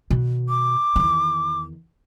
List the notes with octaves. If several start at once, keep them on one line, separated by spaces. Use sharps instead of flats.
B2 D#3
D6
E2 D#3